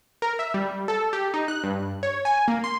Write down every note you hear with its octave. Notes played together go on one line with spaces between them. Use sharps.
A#4
E5
G3
A4
G4
D#4
F#6
G2
C#5
G#5
A#3
C6